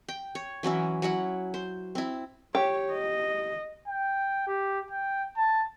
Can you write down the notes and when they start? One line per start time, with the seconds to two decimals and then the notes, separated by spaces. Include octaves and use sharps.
0.08 G5
0.35 C#5
0.63 E3 F#3 C#4 E4
1.02 F#3 C#4 E4 F#5
1.54 C5
1.95 C4 E4
2.55 G4 C#5
2.93 D#5
3.88 G5
4.47 G4
4.91 G5
5.37 A5